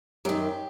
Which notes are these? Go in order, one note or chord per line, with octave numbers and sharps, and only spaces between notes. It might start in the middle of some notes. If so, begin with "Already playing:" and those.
F#2 D#3 G4